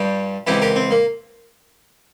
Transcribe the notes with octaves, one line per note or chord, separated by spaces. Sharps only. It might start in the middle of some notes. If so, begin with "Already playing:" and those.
Already playing: G2 G3 F4
C#2 C3 E3 E4 G4
G4 A#4
C4
A#3